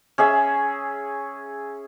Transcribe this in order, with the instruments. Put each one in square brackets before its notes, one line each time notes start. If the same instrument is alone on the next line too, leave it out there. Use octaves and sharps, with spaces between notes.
[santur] C#4 G#4 E5